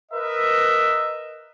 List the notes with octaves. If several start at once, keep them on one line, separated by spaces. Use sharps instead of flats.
A#4 B4 D#5 E5